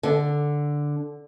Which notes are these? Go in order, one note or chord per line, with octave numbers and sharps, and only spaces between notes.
D3